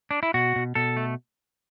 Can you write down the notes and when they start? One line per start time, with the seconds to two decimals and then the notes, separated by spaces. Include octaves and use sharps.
0.11 D4
0.23 E4
0.34 B2 F#4
0.56 B2
0.75 B2 A4
0.97 A3